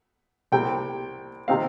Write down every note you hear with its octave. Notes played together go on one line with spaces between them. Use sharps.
C2 C3 G3 C4 G5
C3 D#3 C4 D#4 F5